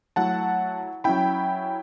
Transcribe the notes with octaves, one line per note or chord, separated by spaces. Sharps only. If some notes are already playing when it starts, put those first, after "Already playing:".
F#3 A3 E4 F#5 A5
F#3 C#4 E4 G5 B5